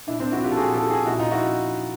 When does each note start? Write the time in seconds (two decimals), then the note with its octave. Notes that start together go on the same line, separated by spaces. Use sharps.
0.07 A#2 D4 E4
0.20 C4 D4
0.32 F3 E4 F#4
0.44 F4 G4
0.52 A4
0.57 A#2 F#4 G#4
0.73 G4 A4
0.82 F3
0.90 F#4 G#4
1.06 A#2 E4 F#4
1.19 D#4 F4
1.31 F3 E4 F#4